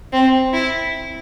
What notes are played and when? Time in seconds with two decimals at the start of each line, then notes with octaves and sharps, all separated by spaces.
0.13 C4
0.53 E4